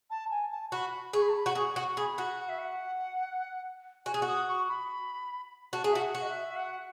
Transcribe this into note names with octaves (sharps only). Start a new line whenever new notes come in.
A5
G#5
A5
F#4 B5
G#4 C#6
B5
A5
B5
F#4
G#4 C#6
F#4
C#6
G#4 B5
F#4
F#5
E5
F#5
F#4 G#5
G#4
F#4
D#6
C#6
B5
F#4 A5
G#4
E5
F#4
F#5
F#4
D#5
E5
E5
F#5